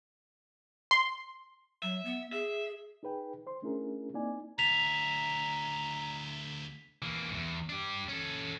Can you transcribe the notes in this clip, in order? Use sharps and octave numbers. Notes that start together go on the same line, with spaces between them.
C6
F#3 E5
B3
G#4 E5
D#4 G#4 B4 G5
C5 C6
A3 C#4 D4 E4 G#4 A#4
A#3 C4 D#4 E4 D5 G#5
D2 E4 A#5 B6 F7
E3 A#3
E2 G#2
D4 G4
C#4 A4